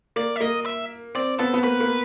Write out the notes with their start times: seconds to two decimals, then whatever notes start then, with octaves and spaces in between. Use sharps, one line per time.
0.16 A#3 D5
0.36 E5
0.41 A#3 D#5
0.66 E5
1.15 C4 D5
1.39 B3 A4
1.54 B3
1.64 A#3 B4
1.80 A#3